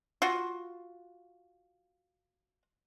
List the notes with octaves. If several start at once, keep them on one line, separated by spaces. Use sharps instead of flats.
F4 F#4